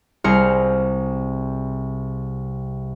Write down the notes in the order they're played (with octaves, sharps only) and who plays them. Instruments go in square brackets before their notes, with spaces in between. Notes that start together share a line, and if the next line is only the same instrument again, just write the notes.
[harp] C2 G#4 A#4 C5 F6 C#7